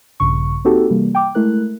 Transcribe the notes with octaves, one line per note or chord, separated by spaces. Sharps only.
A#1 G2 C#3 C#6
A#3 C4 D#4 F#4 G4 A4
C3 E3 G3 A#3
G5 D6
G#3 A3 E4 A#4 F#6